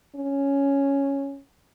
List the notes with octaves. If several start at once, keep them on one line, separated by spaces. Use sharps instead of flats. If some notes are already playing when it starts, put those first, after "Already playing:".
C#4